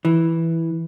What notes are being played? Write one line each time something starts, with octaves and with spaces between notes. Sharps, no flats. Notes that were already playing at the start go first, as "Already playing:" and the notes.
E3